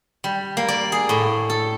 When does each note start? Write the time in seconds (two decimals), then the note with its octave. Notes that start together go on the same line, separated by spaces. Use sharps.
0.24 G3
0.57 A#3
0.68 D5
0.92 G#4
1.09 A2
1.50 A4